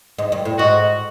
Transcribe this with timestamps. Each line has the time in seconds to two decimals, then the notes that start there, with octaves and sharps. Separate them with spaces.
0.18 G#2
0.32 G2
0.45 A2
0.58 G#2 F#4